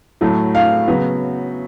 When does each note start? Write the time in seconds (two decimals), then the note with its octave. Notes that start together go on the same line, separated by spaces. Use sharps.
0.21 A2 F#3 A3
0.55 F5
0.88 C#3 F#3 B3